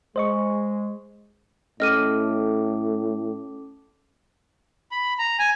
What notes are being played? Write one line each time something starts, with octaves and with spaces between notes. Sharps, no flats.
G#3 C5 D#5 C#6
A2 C#4 A4 D#5 D6 F6 D#7
B5
A#5
G#5